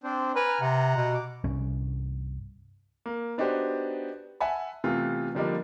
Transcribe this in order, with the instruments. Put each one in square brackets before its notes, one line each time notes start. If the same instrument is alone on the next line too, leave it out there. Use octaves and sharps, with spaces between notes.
[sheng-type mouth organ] C4 D4 C5
[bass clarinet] B4 [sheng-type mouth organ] G#5 A#5 F6
[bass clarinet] C3 [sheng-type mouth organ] F#5 A#5
[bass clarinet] B2
[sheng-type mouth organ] D6
[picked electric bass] C2 G2 C#4
[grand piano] A#3
B3 D4 D#4 F#4 G4 C5
E5 F#5 G#5 A5 B5
C3 E3 A3 B3 F4
D3 F3 G3 A#3 D4 D#4